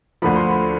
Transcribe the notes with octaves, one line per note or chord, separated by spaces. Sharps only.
D2 D3 F3 B5
C6
B5